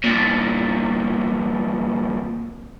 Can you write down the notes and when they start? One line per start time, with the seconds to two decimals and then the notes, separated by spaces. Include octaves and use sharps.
0.04 C2 A#2